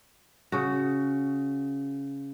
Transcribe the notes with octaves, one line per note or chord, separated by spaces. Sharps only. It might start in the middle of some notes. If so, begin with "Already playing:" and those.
C#3 F#4